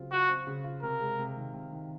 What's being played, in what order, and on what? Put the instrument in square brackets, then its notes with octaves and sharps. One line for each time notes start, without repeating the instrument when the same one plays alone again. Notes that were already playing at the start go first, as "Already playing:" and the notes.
Already playing: [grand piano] C#3 F#3 C4 F4
[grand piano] F4 [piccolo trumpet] F#4
[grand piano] C4
C#3
F4
[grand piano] C3 [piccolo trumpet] A#4
[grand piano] G#3
C3
D#3
C3
D#3